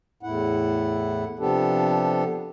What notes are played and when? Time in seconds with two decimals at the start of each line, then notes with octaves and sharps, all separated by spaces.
0.23 E2 A2 E4 F#5
1.39 C3 F3 B3 D4 G4 A4